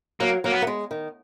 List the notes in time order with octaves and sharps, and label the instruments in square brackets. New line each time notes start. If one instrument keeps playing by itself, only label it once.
[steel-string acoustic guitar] F#3 [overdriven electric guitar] A#3
[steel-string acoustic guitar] F#3 [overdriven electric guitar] A#3
[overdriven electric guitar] B3
[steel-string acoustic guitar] A#3
G#3
D#3